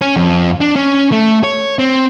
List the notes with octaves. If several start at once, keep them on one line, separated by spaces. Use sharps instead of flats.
C#4
F2
D4
C#4
A3
C#5
C4